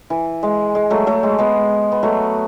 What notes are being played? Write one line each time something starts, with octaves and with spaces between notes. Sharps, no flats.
E3
G#3
G#3
F#3 A3
F#3 A3
G#3
G#3 B3
B3
F#3 A3